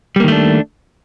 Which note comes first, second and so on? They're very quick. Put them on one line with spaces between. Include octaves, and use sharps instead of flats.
G3 A#3 D#3 A3 D4